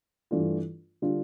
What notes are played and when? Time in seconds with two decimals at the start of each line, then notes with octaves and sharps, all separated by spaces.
0.31 G2 E3 A3 D4 F4
1.02 D3 G3 D4 F4